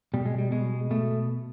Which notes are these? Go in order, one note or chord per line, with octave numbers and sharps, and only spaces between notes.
B2 G3
G#3
G3
B2 G#3
B2 A3